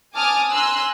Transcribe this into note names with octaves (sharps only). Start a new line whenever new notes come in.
G#5 A5 D6 D#6 F6
G#5 A#5 C6 E6 F#6